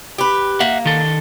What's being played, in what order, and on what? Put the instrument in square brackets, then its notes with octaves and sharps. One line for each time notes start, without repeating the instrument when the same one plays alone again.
[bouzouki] G4 B4
[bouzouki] A#3 [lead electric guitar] E5 F#5
[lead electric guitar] D#3 A4